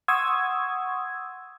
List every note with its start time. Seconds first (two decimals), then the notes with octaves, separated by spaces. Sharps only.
0.08 F#5 C6 C#6 D#6 E6 G#6